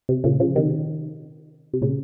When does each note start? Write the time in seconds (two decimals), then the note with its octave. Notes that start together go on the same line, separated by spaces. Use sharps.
0.09 C3
0.24 A#2 C#3
0.40 C#3 F3
0.55 C3 D#3
1.73 C3
1.81 A#2 C#3